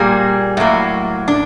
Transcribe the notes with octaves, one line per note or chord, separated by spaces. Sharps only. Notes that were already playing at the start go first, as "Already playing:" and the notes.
Already playing: A#2 G3 A#3 G#4
A2 F#3 A#3
D4